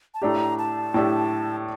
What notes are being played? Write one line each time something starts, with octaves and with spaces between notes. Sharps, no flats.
A5
A2 A3 D4 G4 A#5
A5
A2 A3 D4 G4